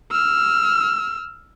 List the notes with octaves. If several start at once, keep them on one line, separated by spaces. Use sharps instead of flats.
E6 F6